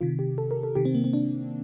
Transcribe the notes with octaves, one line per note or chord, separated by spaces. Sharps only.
C3 D#3 F4
G4
A4
A#4
A4
C3 D#3 G4
C4
A#3
C4
D4